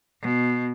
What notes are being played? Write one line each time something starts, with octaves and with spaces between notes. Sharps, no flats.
B2